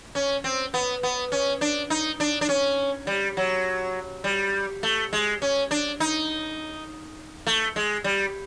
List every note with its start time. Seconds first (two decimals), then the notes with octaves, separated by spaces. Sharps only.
0.15 C#4
0.44 C4
0.74 B3
1.03 B3
1.32 C#4
1.61 D4
1.90 D#4
2.20 D4
2.41 D4
2.49 C#4
3.07 G3
3.37 F#3
4.24 G3
4.83 A3
5.13 G#3
5.42 C#4
5.71 D4
6.00 D#4
7.47 A3
7.76 G#3
8.04 G3